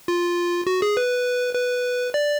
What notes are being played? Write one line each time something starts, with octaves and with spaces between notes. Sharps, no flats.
F4
F#4
G#4
B4
B4
D5